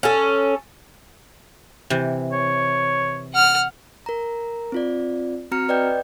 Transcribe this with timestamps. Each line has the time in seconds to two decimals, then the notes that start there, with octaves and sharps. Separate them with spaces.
0.03 C#4 A4
1.90 C3 E3
2.32 C#5
3.33 F#5 F6
4.06 A#4 A#5
4.72 C4 F4 D5
5.51 C4 F#4 A#5 F6 C#7
5.69 B4 D5 D#5 G5 G6